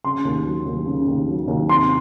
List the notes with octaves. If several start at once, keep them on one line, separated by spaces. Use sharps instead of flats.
C#3 C6
D#2
F#3
D#2
C#3
D#2
F#3
D#2
C3 C6